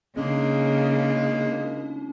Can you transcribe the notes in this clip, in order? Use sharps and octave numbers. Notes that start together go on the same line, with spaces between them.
C#3 G#3 A#3 C#4 D4